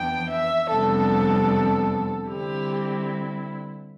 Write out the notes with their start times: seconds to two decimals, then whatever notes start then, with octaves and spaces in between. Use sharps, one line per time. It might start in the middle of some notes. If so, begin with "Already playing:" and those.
Already playing: F2 E3 B3 D4 G5
0.30 E5
0.69 F2 C3 G3 B3 D4 A4
2.26 D3 G3 C4 E4 G4